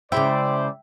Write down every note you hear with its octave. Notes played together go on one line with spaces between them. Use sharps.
C#3 G#3 E4 C5 D5 E5 G5